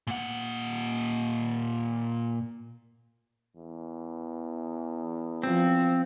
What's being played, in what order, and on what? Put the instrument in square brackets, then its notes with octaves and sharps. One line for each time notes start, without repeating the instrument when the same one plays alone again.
[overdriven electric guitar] A#2 F#5
[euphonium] E2
[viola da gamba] F3 [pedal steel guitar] C4